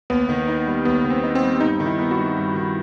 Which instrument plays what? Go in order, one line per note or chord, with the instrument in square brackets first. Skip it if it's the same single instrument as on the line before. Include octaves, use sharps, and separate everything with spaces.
[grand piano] D#2 [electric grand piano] B3
[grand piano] D#3
D#4
G3
[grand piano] D#2 [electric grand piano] B3
[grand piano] D#3
[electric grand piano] C4
[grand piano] D#4
[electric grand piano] C4
[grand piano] G3
[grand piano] G2 [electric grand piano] D#4
[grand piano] D#3
[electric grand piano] E4
[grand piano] B3
[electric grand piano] F#4
[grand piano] G3
G2
D#3